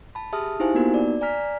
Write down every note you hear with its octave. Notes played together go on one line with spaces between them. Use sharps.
A5 B5
G4 G#4 E5 A5 D#6 F6
D#4 E4 G4 C5 F5 G#5
A#3 B3 D#4 F4 F#4 A#4
D5
D5 G#5 A#5 F6 B6